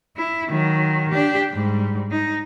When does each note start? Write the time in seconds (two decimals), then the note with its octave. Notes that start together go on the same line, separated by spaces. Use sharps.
0.16 E4
0.49 D#3 F#3
1.11 D4 G4
1.53 G#2 G3
2.11 D#4